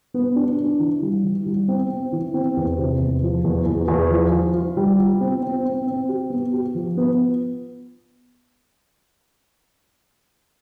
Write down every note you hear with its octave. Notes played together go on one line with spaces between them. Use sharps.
B3
D4
D4
E3
G3
E3
G3
C4
C4
E3
C4
E2
C3
E2
F3
E2
E2
E2
F3
F4
F4
G3
F4
C4
C4
C4
C4
G4
B3
G4
F3
B3